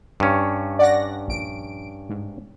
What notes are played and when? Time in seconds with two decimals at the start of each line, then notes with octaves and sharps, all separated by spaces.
0.20 G2 C#4
0.79 D5 F#5 A#6
1.28 A#1 D7
2.09 G#2